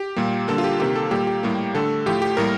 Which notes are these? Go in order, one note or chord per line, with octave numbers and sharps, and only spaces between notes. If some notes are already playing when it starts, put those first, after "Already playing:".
Already playing: G4
A#2 G3 A#3
D3 G3 A#3 A4
F4
G4
C3 D#3 A#3 G4
A4
A#2 G3 A#3 G4
G4
A2 G3 A#3
D3 A3 A4
A2 F3 A3 G4
G4
A2 G3 A#3 A#4